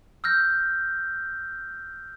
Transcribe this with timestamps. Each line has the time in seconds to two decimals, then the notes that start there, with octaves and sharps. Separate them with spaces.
0.24 E6 F6 G6 A#6